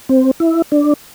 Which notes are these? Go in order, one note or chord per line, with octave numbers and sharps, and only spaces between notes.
C4
E4
D4